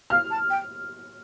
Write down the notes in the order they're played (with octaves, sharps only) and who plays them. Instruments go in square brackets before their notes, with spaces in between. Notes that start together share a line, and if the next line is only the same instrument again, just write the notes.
[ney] F5 [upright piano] F6
[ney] A5
G5